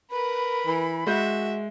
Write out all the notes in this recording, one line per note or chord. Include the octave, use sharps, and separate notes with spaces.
A#4 B4 B5
E3
G#3 F#4 E5 G6